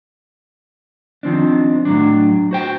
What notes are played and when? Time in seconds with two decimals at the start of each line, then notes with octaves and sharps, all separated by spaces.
1.23 D#3 F3 C4 D4
1.85 A2 F#3 D4
2.51 F#4 C5 G5